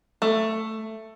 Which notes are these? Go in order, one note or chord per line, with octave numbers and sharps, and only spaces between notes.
A3